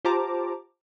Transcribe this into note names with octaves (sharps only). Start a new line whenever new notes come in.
F4 G4 C5 A5 A#5 D6